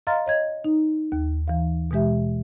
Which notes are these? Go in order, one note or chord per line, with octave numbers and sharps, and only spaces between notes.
D#5 F5 A#5 C6 F6 A6
C#5 D#5 G#6
D#4
D#2
E3 F5
B2 E3 G#3 G4 E5